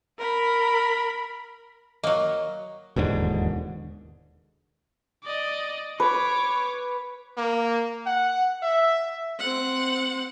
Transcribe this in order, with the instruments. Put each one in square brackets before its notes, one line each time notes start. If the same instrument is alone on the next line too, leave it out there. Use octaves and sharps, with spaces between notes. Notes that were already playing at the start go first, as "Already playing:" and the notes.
[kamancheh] A#4 B5
[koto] F#3 A#3 [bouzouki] D#5
[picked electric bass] E1 D#2 G#2 D3
[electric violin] D5 D#5
[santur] B4 [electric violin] C#5 D6
[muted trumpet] A#3
F#5
E5
[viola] C4 F#5